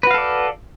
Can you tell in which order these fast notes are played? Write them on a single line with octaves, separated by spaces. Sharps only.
B4 F#4 F5 A4 D5